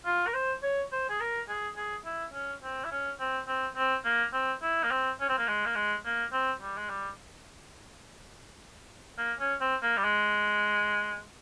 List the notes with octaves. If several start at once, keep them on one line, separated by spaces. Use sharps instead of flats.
F4
A#4
C5
C#5
C5
G#4
A#4
G#4
G#4
E4
C#4
C4
E4
C#4
C4
C4
C4
A#3
C4
E4
A#3
C4
C#4
C4
A#3
G#3
A#3
G#3
A#3
C4
G3
G#3
G3
A#3
C#4
C4
A#3
G3
G#3